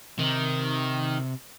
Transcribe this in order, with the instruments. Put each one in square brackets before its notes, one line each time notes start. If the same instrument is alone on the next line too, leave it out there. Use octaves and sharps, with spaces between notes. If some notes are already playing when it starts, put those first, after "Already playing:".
[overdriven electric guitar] C3 [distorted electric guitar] D#3